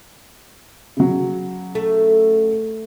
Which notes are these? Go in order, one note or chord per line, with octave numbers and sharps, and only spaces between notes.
C#3 F#3
A3